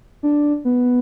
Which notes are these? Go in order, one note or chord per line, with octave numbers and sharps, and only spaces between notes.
D4
B3